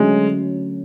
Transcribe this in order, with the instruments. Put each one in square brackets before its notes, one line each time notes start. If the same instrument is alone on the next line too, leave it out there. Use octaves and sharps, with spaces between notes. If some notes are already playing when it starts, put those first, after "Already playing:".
Already playing: [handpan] D3 F#3 A3 C#4 [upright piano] G#3